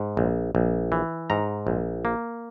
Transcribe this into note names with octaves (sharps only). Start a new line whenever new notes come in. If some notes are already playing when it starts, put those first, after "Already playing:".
Already playing: G#2
A#1
A#1
E3
G#2 A#5
A#1
A#3